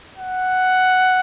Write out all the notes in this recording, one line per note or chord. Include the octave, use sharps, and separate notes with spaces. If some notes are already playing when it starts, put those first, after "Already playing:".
F#5